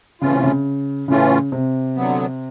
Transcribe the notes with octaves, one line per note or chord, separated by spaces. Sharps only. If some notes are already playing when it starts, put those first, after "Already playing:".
A2 C#3 E3 A3 C#4 F4
C3
C#3
A2 C#3 E3 A3 C#4 F4
C3
D3 F#3 B3